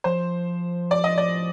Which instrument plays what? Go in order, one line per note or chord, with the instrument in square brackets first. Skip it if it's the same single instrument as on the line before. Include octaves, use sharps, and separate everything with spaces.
[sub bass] F3 [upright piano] C5
[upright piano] D5
D#5
D5